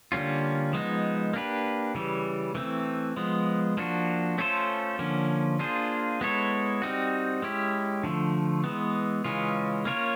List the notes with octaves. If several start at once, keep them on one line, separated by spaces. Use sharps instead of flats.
D3 G3 A#3 C#4 F4
F3 G#3 B3 D#4
A#3 D4 G4 B4
C#3 E3 G3
E3 A3 C4
F3 G#3 B3
F3 A#3 D4 F#4
A3 C#4 F4 A4 C5
D3 F3 A#3 C#4
A#3 D4 F4 G#4 C5
G#3 B3 E4 A4 C#5
G3 C4 D#4 F#4
G#3 C#4 E4 G4
D3 F3 A3
E3 G#3 B3
C#3 E3 G#3 C#4 F4
A#3 C#4 F4 A#4 C#5